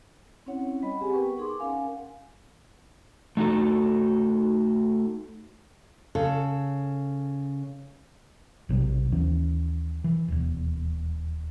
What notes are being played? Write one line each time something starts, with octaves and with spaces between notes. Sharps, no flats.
C4 C#4 E4 C#5 F#5
G3 D#5 B5
C4 G4 G#4 F#5 G#5
B3 A#4 B4 G5 C#6
D#4 G#4 C6 D6
C#4 A#4 F5 F#5 G#5
A3 D#4 F#4 A4
C#3 A4
A#1 C3 E3 G3
D#2 E3 C#4
E3
D#1 E2